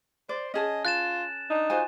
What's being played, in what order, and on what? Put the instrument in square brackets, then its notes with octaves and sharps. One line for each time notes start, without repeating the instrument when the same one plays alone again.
[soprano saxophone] C5 [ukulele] D5
[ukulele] C#4 G#4 A5 [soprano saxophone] D#5
[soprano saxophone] F4 [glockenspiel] F#6 A6 E7
[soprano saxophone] D4 [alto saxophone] D#4
[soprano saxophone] F4 [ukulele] F#4 C5 G#5